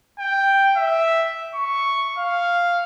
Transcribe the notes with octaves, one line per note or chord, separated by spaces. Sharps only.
G5
E5
C#6
F5